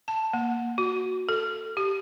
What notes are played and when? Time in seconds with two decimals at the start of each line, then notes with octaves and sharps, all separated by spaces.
0.08 A5
0.33 A#3
0.78 F#4
1.29 A4
1.77 G4